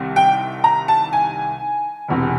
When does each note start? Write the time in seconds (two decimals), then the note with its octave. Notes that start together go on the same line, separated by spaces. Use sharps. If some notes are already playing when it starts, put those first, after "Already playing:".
Already playing: C2 C3 D#3
0.16 G5
0.64 A#5
0.88 A5
1.13 G#5
2.08 E1 E2 C3